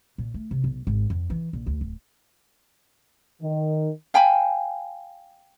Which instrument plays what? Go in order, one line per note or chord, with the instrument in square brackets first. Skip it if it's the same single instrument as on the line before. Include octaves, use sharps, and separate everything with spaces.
[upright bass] A#2
A3
C3
B1
G#1
F2
E3
A#1
D2
D1
[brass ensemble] D#3
[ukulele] F5 G5 G#5 B5